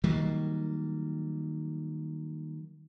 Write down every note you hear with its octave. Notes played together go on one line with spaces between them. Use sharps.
D#3 F#3 G3 A#3